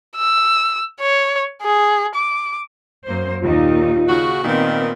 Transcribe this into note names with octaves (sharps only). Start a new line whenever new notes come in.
E6
C#5
G#4
D6
F#2 A#3 C5
D#2 A#2 D#4 F4
C#3 F#4
A#2 D#3 B3 C4